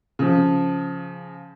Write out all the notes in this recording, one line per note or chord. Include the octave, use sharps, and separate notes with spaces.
C#3 F3